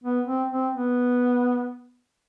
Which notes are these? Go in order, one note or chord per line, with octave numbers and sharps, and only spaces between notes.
B3
C4
C4
B3